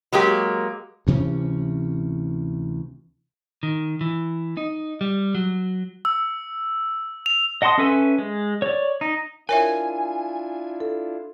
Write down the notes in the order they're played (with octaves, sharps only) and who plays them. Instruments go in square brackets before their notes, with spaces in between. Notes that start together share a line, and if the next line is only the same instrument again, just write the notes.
[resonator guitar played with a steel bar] F#3 G#3 A#3 G4
[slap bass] D2 C3 E3 C#4
[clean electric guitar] D#3
E3
D#4
G3
F#3
[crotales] E6
F7
[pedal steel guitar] D#5 F#5 A5 C6 D#6
C#4 A4 B4 E5 G#5
G#3
C#5 D5
D#4
[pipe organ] D4 E4 F4 [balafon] A#4 C#5 E5 [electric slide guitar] G#5
[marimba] A4